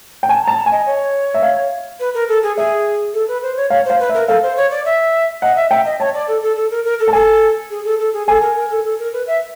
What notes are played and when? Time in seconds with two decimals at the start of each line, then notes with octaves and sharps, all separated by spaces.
0.23 G5
0.29 G#5 A5
0.43 A5 A#5
0.57 A5
0.66 G#5
0.72 D#5
0.86 C#5
1.34 E5
1.42 F5
2.00 B4
2.14 A#4
2.28 A4
2.43 G#4
2.57 G#4 E5
3.13 A4
3.28 B4
3.43 C5
3.57 C#5
3.70 C#5 F5
3.85 C5 F5
4.00 B4
4.09 E5
4.14 A#4
4.28 A4 F5
4.43 C5
4.57 C#5
4.71 D5
4.85 E5
5.42 D#5 F#5
5.56 E5
5.71 E5 G5
5.85 D#5
6.00 C#5 A5
6.14 D5
6.28 A4
6.42 A4
6.56 A4
6.71 A#4
6.85 A#4
6.99 A4
7.08 A5
7.13 A4 G#5
7.70 G#4
7.85 A4
7.99 A4
8.13 G#4
8.28 A4 G#5
8.41 A#4
8.56 A#4
8.70 A4
8.84 A4
8.99 A#4
9.13 B4
9.27 E5